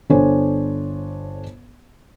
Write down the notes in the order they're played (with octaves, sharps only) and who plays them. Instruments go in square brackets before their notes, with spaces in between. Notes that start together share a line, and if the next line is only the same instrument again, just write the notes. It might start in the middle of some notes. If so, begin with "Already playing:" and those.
[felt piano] G1 D4 A4 C5 C#5 G#5